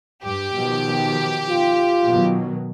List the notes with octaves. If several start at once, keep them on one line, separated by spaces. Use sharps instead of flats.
G2 G4
B2 D#3 F3
F4
B2 D#3 F#3